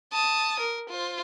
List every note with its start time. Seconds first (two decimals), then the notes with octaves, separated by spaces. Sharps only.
0.13 A5 D#6
0.60 A#4
0.90 F4 C5